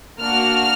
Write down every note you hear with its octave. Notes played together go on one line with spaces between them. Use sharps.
A#3 D4 F#4 F6